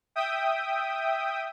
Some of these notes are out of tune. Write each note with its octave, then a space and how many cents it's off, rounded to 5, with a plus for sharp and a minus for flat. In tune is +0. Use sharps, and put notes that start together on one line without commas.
E5 +0 G5 +0 D#6 +0